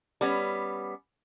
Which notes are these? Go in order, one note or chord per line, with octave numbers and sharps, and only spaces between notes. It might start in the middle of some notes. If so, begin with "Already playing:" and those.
G3 B3 C#4